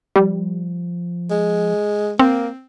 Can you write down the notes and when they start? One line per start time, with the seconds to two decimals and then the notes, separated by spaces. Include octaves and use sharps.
0.16 F3 G3
1.30 G#3
2.19 A#3 C4